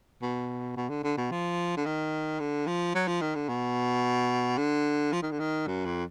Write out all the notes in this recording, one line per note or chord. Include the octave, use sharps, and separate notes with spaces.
B2
B2
D3
D3
B2
F3
D3
D#3
D3
F3
F#3
F3
D#3
D3
B2
D3
F3
D#3
D3
D#3
F#2
F2